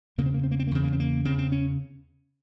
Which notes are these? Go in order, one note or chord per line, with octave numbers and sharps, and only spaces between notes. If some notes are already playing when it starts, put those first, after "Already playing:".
E2 C#3 A#3
C4
A#3
C4
A#3
C4
A#3
E2 C#3 C4
A#3
C4
A#3
E2 C#3 C4
C4
C#4